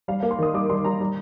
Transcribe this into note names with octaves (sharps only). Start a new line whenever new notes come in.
G3 F5
F5
A#3
C6
D#3 D#6
G3 D6
G3 C6
G3 A#5
G3